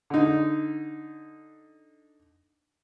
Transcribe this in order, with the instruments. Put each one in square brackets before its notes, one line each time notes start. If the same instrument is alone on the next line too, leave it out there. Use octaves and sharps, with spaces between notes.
[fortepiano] D3 D#4